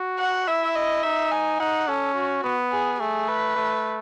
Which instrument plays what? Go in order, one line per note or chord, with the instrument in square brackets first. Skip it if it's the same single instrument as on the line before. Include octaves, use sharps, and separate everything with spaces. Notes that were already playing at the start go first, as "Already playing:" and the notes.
Already playing: [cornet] F#4
[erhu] F#5
[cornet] E4 [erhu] E5
[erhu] D#5
[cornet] D#4 [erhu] E5
[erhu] G#5
[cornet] D#4 [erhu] F#5
[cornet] C#4 [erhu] A4
[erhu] F#4
[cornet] B3
[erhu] G#4
[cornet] A3 [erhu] G#4
[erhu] B4
[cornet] A3